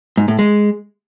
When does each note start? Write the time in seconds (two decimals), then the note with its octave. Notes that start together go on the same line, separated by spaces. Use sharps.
0.17 G#2
0.28 A2
0.39 G#3